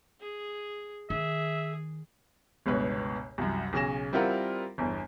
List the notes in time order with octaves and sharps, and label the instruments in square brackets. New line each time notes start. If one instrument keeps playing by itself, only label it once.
[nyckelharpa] G#4
[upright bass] D#3 [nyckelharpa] G#4 [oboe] E5
[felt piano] G1 C#2 B2 B4 C#5
C2 F#2
B1 C#3 C#4 G#5 A#6 E7
G3 C4 E4 F4 A#4 F#5
G1 E2